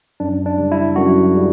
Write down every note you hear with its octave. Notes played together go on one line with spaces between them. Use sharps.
F#2 D4
D4
C#3 G3
E4
F#2 F#4
C#3 G3